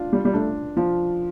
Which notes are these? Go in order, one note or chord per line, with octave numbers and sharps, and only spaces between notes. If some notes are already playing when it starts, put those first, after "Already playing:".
Already playing: D4 F4
G3
G3
A3 D4
F3 F4